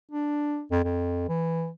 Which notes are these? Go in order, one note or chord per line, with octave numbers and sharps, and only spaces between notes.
D4
F2
F2
E3